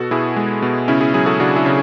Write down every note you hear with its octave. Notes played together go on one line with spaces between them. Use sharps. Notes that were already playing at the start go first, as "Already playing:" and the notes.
Already playing: B2 F#4 A4
B2 E4 G#4
G#3
B2
C#3 C#4 E4
E4 G#4
F#3 E4 G#4
F#4 A4
C#3 D4 F#4
E4 G#4
C#3